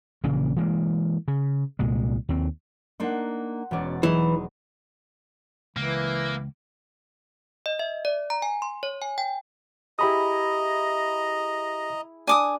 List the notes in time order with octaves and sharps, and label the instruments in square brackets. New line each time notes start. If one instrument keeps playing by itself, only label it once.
[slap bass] A#1 C#3 E3 A#3
E3 G#3 A#3
C#3
C2 A#2 G#3
D#2 C4
[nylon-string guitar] A#3 D4 D#4 [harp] F#5 C6
[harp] E1 D5 A6 [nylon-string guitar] B2 C#4
[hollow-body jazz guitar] E3 [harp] F#3 [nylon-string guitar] G#3 D#4
[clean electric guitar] C#2 [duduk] E3 [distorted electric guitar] A#3
[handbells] D#5
E5
D5
A#5
G#5
C6
C#5
G#5
G5
[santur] E4 G#4 [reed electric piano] G4 B5 D#6 [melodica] D#5 A#5
[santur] D4 [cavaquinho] G#5 D6 D#6